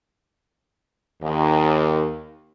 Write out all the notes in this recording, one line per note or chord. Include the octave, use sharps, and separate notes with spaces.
D#2